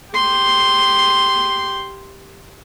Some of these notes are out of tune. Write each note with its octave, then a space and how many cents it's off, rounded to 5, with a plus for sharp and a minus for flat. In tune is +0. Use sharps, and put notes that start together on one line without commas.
G4 +0 C6 +0